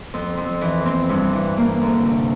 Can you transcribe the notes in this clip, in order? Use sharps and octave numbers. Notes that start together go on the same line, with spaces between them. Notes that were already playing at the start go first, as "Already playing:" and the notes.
F2
F2
E3
C4
G2
E3
A#3
D2
C3